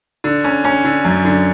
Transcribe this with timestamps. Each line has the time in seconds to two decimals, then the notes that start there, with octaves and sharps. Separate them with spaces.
0.24 D3
0.44 C#4
0.64 C#4
0.85 D3
1.05 F#2
1.25 D3